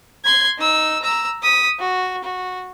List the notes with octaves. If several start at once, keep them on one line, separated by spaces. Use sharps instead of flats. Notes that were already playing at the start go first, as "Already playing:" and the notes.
C6 G#6
D#4 E6
A#5 E6
D#6 B6
F#4
F#4